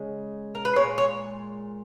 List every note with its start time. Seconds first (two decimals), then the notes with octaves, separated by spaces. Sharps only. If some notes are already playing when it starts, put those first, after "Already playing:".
Already playing: C#3 G#3
0.55 A#4
0.65 B4
0.76 A#2 G#3 C#5
0.98 C#5